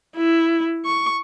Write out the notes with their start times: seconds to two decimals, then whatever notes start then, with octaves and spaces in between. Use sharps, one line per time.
0.16 E4
0.86 C#6